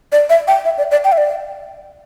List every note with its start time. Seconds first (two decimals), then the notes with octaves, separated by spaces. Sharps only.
0.12 D5
0.30 E5
0.48 G5
0.65 E5
0.78 D5
0.91 D5
1.04 G5
1.12 E5
1.18 D5